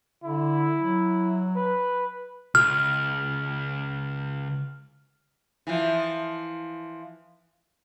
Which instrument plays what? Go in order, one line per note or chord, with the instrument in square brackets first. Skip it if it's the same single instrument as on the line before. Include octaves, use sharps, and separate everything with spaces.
[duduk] D3 [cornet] E4
[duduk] F#3
[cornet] B4
[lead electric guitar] C#2 [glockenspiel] F6
[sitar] E3 F3